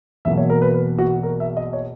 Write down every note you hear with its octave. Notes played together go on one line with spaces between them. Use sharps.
E2 B2 F#3 A#3 E5
C#5
A#4
B4
B4
F#4
A#4
E5
D#5
C#5